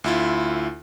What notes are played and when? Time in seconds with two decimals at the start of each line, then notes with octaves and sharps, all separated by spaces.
0.04 D2 E4 F4